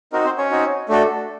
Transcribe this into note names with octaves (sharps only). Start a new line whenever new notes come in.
C4 D#4 F#4 A#4
C4 C5
C#4 C#5
C4 D#4 F#4
A3 D4 F#4 A4